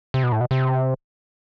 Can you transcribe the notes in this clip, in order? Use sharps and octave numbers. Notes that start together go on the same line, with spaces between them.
C3
B2
A2
B2
C3